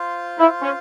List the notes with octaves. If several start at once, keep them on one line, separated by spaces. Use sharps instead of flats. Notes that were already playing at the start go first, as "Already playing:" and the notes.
Already playing: F4 C5 F5
E4
C#4